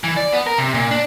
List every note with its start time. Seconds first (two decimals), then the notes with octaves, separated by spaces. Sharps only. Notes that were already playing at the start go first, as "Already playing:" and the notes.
0.04 E3
0.17 D5
0.33 B3
0.47 A#4
0.58 C3
0.74 A#2
0.91 D4